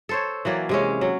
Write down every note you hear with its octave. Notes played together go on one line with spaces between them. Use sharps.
A4 C5 C#5
E3 F#3 A#3 D5
C3 G#3 C#4
F#3